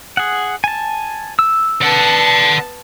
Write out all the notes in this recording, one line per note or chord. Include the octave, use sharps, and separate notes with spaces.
G#4 F#5
G#5 A5
E6
B3 D5 F#5 A5